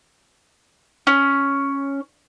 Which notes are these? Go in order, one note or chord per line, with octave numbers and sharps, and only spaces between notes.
C#4